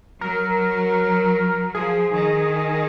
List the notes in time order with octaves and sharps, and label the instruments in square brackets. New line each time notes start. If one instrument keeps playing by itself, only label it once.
[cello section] F#3 [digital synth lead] A#4
[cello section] F3 [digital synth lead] G#4
[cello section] D#3